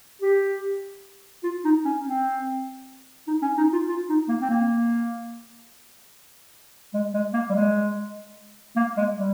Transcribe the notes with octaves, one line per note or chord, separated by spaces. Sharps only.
G4
F4
D#4
C#4
C4
D#4
C#4
D#4
F4
F4
D#4
A#3
C4
A#3
G#3
G#3
A#3
G3
G#3
A#3
G#3
G3